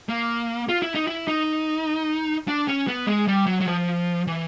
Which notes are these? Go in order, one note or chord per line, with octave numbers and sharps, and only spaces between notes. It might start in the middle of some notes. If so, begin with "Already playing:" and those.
A#3
F4
E4
D#4
E4
D#4
D4
C#4
B3
G#3
G3
F#3
F#3
F3
E3